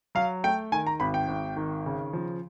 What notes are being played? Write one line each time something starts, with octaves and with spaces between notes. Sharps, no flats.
F#3 F5
A3 G5
D#3 G#5
A#5
G#1 B5
G5
G#1
D#3
C#3
F3